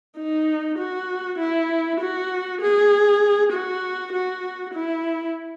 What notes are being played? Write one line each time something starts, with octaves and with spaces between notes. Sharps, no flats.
D#4
F#4
E4
F#4
G#4
F#4
F#4
E4